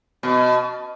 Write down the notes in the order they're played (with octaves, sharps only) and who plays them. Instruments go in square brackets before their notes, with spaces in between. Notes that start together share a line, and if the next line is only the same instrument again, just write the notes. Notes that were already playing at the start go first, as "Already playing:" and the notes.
[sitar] B2